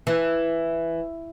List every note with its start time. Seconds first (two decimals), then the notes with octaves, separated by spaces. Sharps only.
0.07 E3